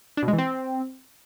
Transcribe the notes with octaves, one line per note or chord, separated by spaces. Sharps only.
D4
B2
G#3
E3
C4